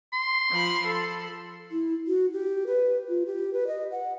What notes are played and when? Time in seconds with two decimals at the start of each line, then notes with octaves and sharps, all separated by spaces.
0.13 C6
0.51 F3 B5
0.86 A4
1.72 E4
2.08 F#4
2.33 G4
2.67 B4
3.09 F4
3.26 G4
3.53 B4
3.67 D#5
3.92 F#5